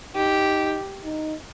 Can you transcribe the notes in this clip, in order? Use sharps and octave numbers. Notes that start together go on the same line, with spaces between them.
D#4 G4
D#4